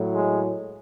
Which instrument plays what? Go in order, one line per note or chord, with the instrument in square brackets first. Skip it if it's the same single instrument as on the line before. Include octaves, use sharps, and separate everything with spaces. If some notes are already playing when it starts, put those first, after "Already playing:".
Already playing: [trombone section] A2 F#3
G#3